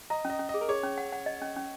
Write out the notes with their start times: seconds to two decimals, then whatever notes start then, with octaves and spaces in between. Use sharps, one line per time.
0.10 D#5 A#5
0.25 C#4 D#5
0.39 C#4
0.49 D#5
0.54 G#4
0.61 A#4
0.69 G#4 C#5
0.83 C#4
0.98 F#5
1.12 F#5
1.26 D#5
1.42 C#4
1.56 C#4